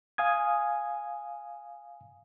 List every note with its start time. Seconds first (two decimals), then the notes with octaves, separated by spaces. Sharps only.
0.18 F5 G#5 D#6 G#6